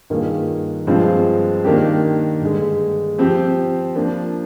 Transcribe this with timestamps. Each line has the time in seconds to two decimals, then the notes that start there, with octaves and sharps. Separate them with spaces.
0.10 G2 D#3 A#3 F4 G#4
0.87 G2 F3 G#3 C4 F4
1.64 D#3 A#3 D4 G4
2.41 G2 D3 G#3
3.18 F3 C4 G4
3.95 F3 A#3 D4